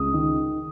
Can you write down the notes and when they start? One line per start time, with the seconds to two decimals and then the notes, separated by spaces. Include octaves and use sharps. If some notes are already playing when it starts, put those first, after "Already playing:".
Already playing: C#2 D#6
0.13 D#3